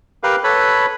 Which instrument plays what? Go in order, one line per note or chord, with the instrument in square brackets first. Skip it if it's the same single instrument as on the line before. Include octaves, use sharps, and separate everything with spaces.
[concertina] G4 A#4 B4 F5
A4 B4 C#5 B5